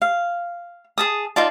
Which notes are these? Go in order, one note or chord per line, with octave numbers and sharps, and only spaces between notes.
F5
G#4 A5 D#6
D#4 F4 D5 A5